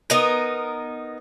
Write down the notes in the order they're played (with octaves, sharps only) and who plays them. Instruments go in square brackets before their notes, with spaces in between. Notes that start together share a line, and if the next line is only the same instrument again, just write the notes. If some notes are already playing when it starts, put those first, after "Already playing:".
[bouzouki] B3 D#4 A#4